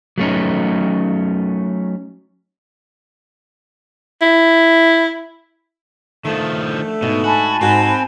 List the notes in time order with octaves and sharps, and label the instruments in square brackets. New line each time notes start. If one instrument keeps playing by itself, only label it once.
[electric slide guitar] F#3 A3 C#4 D#4
[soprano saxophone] E4
[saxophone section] D3 A3 [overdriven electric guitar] D#3 F3
[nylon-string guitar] G#2 [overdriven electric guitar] B2
[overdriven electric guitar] F#4 [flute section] G#5 A5 B5
[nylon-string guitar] G#2 A#4 G5 [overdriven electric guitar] C4 [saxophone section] F#4